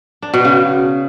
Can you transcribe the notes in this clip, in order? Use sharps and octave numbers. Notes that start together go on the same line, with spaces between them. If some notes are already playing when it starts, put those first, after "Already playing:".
D4
B2
C#3